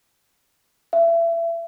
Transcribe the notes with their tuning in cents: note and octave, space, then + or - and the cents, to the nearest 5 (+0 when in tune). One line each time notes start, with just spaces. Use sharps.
E5 +30